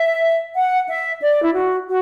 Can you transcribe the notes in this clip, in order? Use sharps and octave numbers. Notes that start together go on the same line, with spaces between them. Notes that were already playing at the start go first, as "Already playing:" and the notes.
Already playing: E5
F#5
E5
D5
E4
F#4
F#4